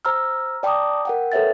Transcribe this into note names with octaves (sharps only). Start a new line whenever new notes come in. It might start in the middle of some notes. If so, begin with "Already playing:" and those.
C5 A#5 E6 F6
D5 G5 A5 A#5 D6 D#6
A#4 F#5 G5
A4 B4 C#5 E5 G5 A6